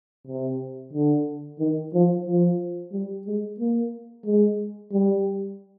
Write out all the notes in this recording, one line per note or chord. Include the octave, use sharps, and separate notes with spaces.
C3
D3
D#3
F3
F3
G3
G#3
A#3
G#3
G3